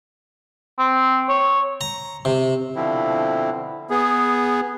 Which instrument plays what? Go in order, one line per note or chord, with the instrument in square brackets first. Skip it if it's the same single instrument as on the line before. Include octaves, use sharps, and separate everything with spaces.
[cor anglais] C4
C#5
[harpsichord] A#5
C3
[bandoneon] B2 D3 F3 C4 E4
B3 G#4